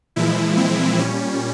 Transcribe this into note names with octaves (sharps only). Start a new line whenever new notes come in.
A#2 E3 F3 G#3 E4
C4
A#2 G3 C#4